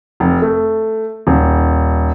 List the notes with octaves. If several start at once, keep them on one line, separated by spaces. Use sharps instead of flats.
F1
A3
D#1